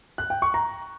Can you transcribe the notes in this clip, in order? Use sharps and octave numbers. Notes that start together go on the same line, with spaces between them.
F#6
G5
C#6
A#5